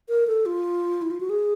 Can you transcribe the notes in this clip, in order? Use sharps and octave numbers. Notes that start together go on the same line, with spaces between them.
A#4
A4
F4
E4
F4
F#4
G#4